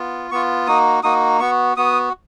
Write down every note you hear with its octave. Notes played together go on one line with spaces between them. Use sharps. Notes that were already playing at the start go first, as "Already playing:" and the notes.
Already playing: B3 F4
B3 F4 C#6
A#3 D#4 F#4 D#6
A#3 D#4 F#4 D#6
B3 F#4 C#6
B3 F#4 D#6